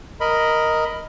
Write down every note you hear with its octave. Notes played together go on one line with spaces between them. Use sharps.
A#4 D#5 B5